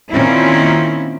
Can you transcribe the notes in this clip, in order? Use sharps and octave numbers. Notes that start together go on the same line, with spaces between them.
A#2 D#3 A#3 C4 C#4 E4